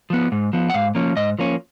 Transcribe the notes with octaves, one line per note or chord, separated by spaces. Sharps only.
F3 B3
G#2
F3 B3
F#5
G#2 F5
F3 A#3 C#4
G#2 D#5
F3 A#3 C#4